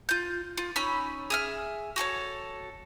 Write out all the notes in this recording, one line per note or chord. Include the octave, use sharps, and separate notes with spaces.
F4 G6
F4
C#4 D#4 B5 E6
G#4 E5 F6
F#4 G#4 A4 C#5